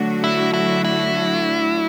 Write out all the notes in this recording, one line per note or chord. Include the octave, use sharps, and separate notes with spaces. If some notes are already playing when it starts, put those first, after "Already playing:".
Already playing: D3 F#3 A3 D4 F#4
E4
E4
E4